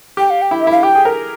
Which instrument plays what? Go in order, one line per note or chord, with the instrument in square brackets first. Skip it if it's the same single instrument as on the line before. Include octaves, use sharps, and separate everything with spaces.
[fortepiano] G4 [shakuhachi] G5
[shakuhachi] F5
G5
[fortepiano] E4
[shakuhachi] E5
[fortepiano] E4 [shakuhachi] F5
[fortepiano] G4 [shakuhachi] G5
[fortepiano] G#4
A#4